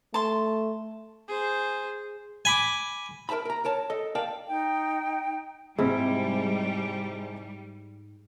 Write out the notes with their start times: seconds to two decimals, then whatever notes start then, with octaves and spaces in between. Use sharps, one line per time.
0.14 A3 A5 C6
1.28 G#4 C5
2.45 G#5 B5 D6
3.29 A#4 B4 E5 A5 B5
3.45 A#4 A#5
3.65 A#4 C#5 A5
3.90 A4 D#5
4.15 A#4 D5 F5 G5 A5
4.49 D#4 G5
5.78 G#2 C3 G3 G#3 E4